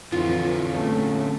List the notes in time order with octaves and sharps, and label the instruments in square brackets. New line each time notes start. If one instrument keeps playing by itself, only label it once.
[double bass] F2 E3 [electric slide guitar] D3 C4 C#5 [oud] F4
[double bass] A3 C#4